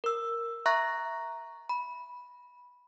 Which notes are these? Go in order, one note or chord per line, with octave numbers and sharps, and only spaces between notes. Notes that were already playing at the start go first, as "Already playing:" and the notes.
A#4 E6
E5 A#5 C#6 F#6 A#6
B5